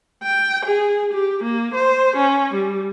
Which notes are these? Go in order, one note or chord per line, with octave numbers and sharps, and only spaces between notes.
G5
G#4
G4
A#3
C5
C#4
G3